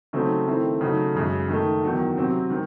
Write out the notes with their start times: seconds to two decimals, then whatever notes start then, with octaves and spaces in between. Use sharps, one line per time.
0.13 C#3 F#3 A3 C4 D#4
0.47 D#3 A3 C4 E4
0.81 C#3 F#3 A3 D#4
1.14 F#2 C#3 G#3
1.48 D#3 A3 D#4
1.83 E2 D#3 F#3
2.17 C3 F#3 C4
2.50 D#3 G#3